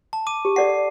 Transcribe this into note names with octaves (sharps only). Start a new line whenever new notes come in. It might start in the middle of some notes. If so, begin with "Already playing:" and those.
A5
D6 D#7
G4
A4 D5 F#5 C7